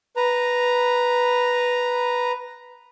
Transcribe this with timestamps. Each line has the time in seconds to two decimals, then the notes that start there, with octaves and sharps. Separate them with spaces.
0.16 B4 A#5